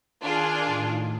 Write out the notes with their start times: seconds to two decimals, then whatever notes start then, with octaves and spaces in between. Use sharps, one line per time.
0.21 D#3 D4 F4 G#4
0.65 A2